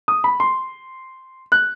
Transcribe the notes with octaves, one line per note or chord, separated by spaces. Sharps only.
D#6
B5
C6
F#6